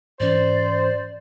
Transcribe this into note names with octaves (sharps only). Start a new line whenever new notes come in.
G#2 E3 C#4 C5 D5